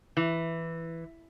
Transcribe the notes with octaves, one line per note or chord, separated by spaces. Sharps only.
E3